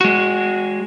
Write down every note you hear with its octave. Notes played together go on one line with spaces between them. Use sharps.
G#3 F#4